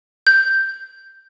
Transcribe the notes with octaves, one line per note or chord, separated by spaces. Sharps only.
G6